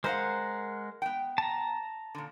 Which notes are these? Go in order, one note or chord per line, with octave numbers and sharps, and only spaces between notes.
G#3 A#4 C5 D#5 F5 F#5
B3 G5
A5 A#5
A#2 D3